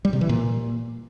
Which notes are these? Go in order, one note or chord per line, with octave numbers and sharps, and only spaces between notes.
G3
C3
E3
A#2